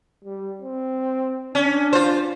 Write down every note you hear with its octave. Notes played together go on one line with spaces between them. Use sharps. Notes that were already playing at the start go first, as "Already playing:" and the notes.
G3
C4
C#4 D4
F4 C5